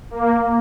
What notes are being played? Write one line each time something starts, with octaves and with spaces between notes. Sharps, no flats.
A#3